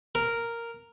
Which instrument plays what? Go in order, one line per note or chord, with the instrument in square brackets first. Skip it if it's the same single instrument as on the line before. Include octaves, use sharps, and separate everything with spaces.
[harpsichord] A#4